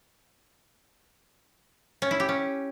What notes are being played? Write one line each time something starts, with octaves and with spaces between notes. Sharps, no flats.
C#4
E4
G4
C#4